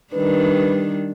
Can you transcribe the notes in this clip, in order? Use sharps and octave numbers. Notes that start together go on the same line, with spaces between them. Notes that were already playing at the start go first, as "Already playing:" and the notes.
D#3 G3 D4 B4